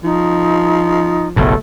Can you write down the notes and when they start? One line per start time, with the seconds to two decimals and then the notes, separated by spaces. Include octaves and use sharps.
0.04 F3 D#4
1.36 F#1 B1 A2 A3